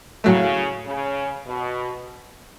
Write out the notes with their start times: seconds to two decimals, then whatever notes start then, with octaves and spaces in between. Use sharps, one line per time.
0.24 A2 C#3 F#3 A3
0.86 C#3
1.46 B2